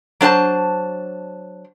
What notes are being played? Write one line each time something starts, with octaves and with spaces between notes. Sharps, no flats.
F#3 D4 C5 A5